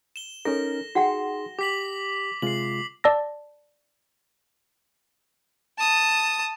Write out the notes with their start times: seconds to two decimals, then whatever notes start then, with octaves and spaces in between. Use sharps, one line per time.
0.16 E7 G7
0.45 C#4 D#4 A4 A#4 A#6
0.95 D#4 F#4 G#4 F#5 G5 C6
1.59 G4 D6 B6 F#7
2.42 C3 G#3 F4 C7 F#7
3.04 D5 A5 E6 A#6
5.79 A5 D#6